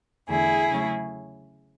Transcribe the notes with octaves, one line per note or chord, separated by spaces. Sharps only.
E2 D3 A3 E4 G#4
C#3 F#3 A3 C#4